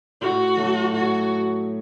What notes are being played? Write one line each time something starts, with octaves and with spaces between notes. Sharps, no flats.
A2 F#4
F#3 A3
A2 F#4